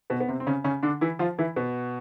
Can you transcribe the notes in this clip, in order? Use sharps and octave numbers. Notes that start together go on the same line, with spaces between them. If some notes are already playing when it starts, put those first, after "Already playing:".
B2 B3
B3
C3 C4
C4
C#3 C#4
C#3 C#4
D3 D4
E3 E4
F3 F4
E3 E4
B2 B3